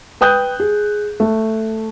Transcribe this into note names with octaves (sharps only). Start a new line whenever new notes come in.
B4 G5 D#6 F#6 G6
G#4
A3